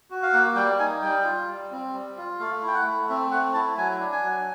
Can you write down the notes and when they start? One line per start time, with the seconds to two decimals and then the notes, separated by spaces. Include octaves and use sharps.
0.10 F#4
0.23 F5
0.33 A#3 F#5
0.55 G3 G5
0.79 D#4 G#5
1.02 G3 G5
1.25 F4
1.48 G3
1.71 C4
1.93 G3
2.17 F4
2.40 A3 F5
2.63 E4
2.68 G5
2.74 F#5
2.86 A3
3.09 C4 E5
3.31 A3 F#5
3.54 E4 A5
3.77 F#3 G#5
4.00 D4
4.12 G#5
4.23 F#3